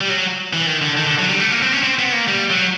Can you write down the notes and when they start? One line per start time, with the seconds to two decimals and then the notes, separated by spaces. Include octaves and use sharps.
0.01 G3
0.09 F#3
0.53 E3
0.67 D#3
0.82 D3
0.97 D#3
1.07 D3
1.19 F#3
1.29 G3
1.40 A3
1.50 A#3
1.63 C4
1.72 C#4
1.83 C4
1.99 B3
2.13 A#3
2.28 G3
2.50 F#3